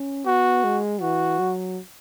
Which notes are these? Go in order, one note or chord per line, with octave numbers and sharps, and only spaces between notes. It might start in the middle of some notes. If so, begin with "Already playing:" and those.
Already playing: C#4
B3 F#4
G#3
E3 F#4
F#3